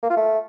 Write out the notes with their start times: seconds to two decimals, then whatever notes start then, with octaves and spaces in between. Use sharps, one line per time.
0.03 A#3
0.10 F4
0.17 A3